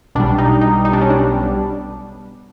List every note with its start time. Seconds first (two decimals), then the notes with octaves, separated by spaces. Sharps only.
0.15 B1 B2 G3 D4
0.38 D#4
0.61 D#4
0.85 D#4
0.93 D4
1.01 C#4
1.10 D4